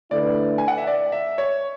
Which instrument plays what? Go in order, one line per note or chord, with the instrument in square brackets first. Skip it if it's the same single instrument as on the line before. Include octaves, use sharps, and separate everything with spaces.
[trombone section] D3 A3 E4 B4 [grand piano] D5
[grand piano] G#5
F#5
E5
D5
E5
C#5